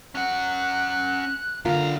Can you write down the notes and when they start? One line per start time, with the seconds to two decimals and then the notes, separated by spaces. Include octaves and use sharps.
0.15 C#4 F#5 F#6
1.65 F#2 D3 A#3 F4 F5 A#5